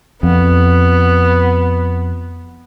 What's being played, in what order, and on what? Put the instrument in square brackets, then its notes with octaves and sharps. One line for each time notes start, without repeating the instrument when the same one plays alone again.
[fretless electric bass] F2 [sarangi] B3